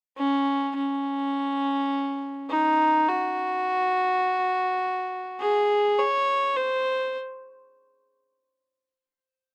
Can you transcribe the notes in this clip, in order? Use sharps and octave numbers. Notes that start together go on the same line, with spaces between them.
C#4
C#4
D#4
F#4
G#4
C#5
C5